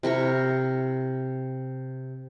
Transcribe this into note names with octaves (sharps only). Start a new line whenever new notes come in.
C3 E4 A#4 C#6